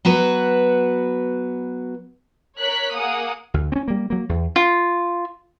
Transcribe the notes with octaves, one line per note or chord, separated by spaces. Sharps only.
F#3 B3 F#4 B4
A#4 C#5 F#6 B6
A#3 G#4 F#5 D#6
D2
C4 C#4
G3 A#3
F#3 A#3
E2
F4